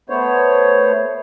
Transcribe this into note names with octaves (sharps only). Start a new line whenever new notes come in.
A3 B3 C5 C#5